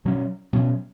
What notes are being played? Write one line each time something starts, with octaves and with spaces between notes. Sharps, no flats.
B2 F#3 C#4
B2 F#3 C#4